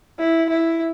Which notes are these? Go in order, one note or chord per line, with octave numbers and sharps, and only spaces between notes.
E4
E4